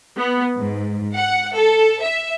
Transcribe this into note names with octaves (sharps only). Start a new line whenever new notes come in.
B3
G#2
F#5
A4
E5